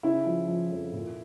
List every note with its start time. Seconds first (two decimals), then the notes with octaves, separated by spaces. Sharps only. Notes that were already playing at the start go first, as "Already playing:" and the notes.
0.03 C#3 E4
0.26 F3
0.48 F3
0.71 F2
0.93 A#2